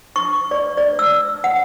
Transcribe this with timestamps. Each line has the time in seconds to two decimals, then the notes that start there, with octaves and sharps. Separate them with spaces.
0.16 C#6
0.51 D5
0.77 D5
0.99 E6
1.44 F#5